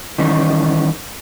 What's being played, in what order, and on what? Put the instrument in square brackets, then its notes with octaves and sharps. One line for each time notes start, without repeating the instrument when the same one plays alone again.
[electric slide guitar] D#3 E3 G3 C#4